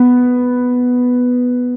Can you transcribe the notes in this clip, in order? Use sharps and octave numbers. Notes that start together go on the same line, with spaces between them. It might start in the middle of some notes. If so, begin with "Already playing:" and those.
Already playing: B3